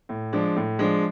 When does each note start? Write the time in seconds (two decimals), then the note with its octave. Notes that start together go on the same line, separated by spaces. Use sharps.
0.09 A2
0.33 F3 G#3 D4
0.56 A2
0.79 F3 G#3 D4